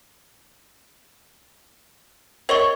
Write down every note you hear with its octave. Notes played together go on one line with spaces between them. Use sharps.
A#4 C#5 D#5 C#6